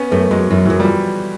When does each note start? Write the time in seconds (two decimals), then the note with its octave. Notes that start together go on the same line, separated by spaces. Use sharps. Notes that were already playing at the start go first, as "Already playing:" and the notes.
Already playing: B3 C#4
0.11 F#2 A3 B3
0.31 F#2 F#3 G#3
0.50 F#2 E3 F#3
0.65 F#2 E3 F#3
0.79 F3 G3